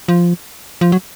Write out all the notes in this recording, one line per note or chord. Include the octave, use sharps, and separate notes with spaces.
F3
F3
F#3